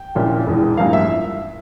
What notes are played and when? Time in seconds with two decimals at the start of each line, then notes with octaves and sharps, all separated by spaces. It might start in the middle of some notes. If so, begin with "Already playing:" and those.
Already playing: G5
0.15 A#1 A#2 F3 C#4 E4
0.46 E1 E2 E3
0.77 A1 G2 F3 A#3 F5
0.93 E5